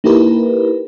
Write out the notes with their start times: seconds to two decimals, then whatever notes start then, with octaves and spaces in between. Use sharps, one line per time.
0.04 A#3 D#4 E4 G4 A#4 B4